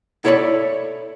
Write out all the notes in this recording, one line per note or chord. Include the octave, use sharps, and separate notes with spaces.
E4 A4 C#5 D5 B5